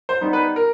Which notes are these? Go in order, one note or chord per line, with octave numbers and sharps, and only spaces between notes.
C5
G3 B3 D#4
B4
A#4